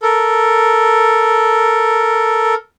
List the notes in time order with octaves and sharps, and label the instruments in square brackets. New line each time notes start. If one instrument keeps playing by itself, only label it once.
[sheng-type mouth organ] A4 A#4